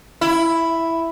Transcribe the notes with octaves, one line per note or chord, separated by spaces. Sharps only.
E4